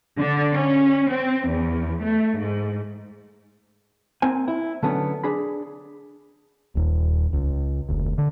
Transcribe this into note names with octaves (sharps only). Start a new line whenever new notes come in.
D3
C#4
C4
E2
A3
G#2
A#3 C4 C5 G#5
E4
D3 F#3 A3 B3 C#4 D4
D4 G#4 B5
D#1 D#2
C#2
F1 D2
D3